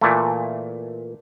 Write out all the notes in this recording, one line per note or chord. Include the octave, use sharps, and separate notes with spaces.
A#2 E3 A3